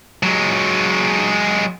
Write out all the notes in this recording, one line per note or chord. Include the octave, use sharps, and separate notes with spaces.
F#3 G#3